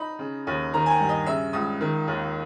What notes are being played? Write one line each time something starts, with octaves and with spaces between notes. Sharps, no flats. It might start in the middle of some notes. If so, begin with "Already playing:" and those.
Already playing: D#4 B5
C#3
D#2
D#3 A#5
G#5
G5
G2
D#5
C#3 E5
C#2 D#6
D#3
D#2